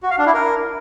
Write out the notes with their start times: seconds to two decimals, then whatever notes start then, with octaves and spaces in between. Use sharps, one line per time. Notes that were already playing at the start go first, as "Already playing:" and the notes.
0.03 F#4
0.11 F5
0.18 D4
0.26 E4
0.34 A#4